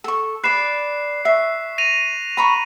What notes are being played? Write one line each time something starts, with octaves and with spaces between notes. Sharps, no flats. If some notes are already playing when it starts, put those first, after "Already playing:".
A4 C#6
B4 D5 F#6 C7 E7
E5 C#6 B6 C7
A#6 D#7 F7
A#5 B5 C#6